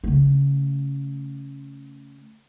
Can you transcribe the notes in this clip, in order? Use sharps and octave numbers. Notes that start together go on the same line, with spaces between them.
C#3 A3